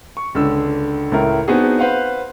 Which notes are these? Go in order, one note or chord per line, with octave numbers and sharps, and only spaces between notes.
C#6
C#2 D3 E6
C#2 A2 E4 A#4
B3 C4 D4 D#4 F#4 G#4
B4 C5 F5 F#5